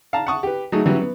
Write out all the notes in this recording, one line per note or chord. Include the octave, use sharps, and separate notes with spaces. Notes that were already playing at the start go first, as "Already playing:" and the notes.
F5 A5 A#5
F#5 A5 C#6 D#6
G4 B4
F#3 A3 D#4 G#4
E3 F#3 G3 C#4
B3